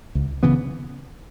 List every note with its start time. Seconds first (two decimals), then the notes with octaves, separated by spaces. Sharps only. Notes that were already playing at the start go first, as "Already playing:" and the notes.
0.15 C#2
0.43 C#3 E3 B3